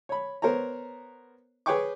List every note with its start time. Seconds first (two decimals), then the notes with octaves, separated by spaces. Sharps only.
0.09 C#5 B5
0.42 B3 A#4 C5 C#5 A#5
1.66 G#4 B4 C#5 G5 C#6 D6